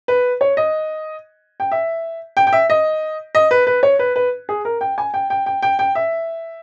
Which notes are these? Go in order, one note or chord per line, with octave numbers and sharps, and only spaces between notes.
B4
C#5
D#5
G5
E5
G5
G5
E5
D#5
D#5
B4
B4
C#5
B4
B4
G#4
A#4
G5
G#5
G5
G5
G5
G5
G5
E5